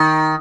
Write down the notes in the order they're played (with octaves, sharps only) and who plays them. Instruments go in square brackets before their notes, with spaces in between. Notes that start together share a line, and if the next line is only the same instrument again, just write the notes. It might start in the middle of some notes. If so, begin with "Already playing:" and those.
Already playing: [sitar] D#3